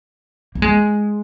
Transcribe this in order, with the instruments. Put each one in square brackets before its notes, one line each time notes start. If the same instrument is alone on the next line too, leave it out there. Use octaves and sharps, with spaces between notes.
[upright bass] A#3
G#3